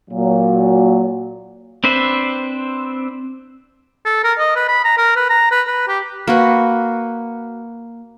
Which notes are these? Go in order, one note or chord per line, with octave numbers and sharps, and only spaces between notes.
A#2 F#3
C4 D4 B4 C5 E5
A4
A#4
D#5
B4
B5
A#5
A#4
B4
A#5
B4
B4
G4
A#3 F#4 B4